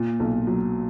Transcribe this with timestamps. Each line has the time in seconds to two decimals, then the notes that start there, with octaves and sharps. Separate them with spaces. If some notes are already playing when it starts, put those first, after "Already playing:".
Already playing: A#2
0.20 B1
0.47 F#3